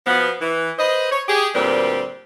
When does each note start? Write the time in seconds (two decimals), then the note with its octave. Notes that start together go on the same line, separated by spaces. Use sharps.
0.07 B2 F3 B3
0.41 E3
0.79 B4 C5 D#5
1.11 C#5
1.29 G4 G#4
1.55 D2 A#2 G3 C4 B4